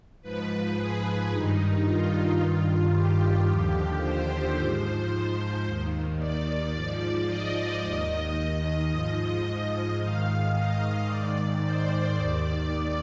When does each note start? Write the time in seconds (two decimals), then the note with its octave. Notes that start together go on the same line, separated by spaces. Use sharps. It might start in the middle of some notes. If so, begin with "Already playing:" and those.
0.22 G#2 F3 B4
0.75 G#4
1.30 G2 D#3 D#4
1.84 F4
2.39 G2 D#3
2.92 G4
3.47 D#2 D3 F3
4.01 C5
4.55 G#2 F3
5.64 D#2 D#3
6.18 D5
6.73 G#2 F3 D5
7.27 D#5
7.81 D#2 D#3
8.35 D#5
8.89 G#2 F3 D#5
9.44 D#5
9.98 G#2 D#3 F5
10.53 D#5
11.07 G#2 D#3 D5
11.62 C5
12.15 D#2 D#3 D5